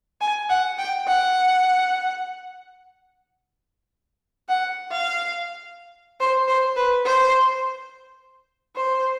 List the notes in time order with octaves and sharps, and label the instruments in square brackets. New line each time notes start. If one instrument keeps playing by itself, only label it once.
[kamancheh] G#5
F#5
G5
F#5
F#5
F5
C5
C5
B4
C5
C5